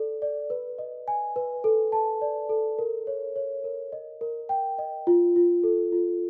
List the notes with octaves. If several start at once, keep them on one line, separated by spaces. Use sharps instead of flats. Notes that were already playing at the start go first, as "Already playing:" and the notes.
Already playing: A4 D5
D5
B4
D#5
G#5
B4
A4
A5
D5
A4
A#4
C#5
C#5
A#4
D#5
A#4
G5
D#5
F4
F4
A4
F4